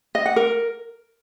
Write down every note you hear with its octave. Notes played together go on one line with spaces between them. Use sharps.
D#5
F#5
A#4